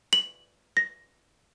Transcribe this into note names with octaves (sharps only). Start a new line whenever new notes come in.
F#7
A#6